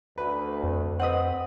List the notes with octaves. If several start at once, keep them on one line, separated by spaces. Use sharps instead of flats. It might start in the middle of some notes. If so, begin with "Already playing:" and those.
D2 B4
F2
C4 B4 D#5 F#5 D#6